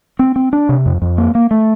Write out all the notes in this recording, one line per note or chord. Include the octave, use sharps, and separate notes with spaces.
C4
C4
D4
C3
F2
F2
A#3
A#3
A3